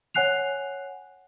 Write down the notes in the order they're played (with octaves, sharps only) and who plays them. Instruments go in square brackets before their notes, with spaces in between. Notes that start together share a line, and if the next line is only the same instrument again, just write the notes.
[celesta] C#5 F#5 G#5 F#6 C7 F7